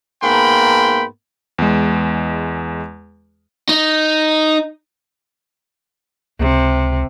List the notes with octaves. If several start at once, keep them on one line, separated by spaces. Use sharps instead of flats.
G#2 A#3 B3 G5 B5 C6
E2 G#3
D#4
C#2 C3